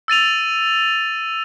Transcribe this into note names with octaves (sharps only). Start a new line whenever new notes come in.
E6 A6 D#7 F7